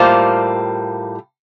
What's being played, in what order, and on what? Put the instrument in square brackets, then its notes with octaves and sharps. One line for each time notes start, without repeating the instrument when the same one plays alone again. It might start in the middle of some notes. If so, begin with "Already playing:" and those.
Already playing: [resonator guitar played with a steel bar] A2 G3 A#3 F4 C5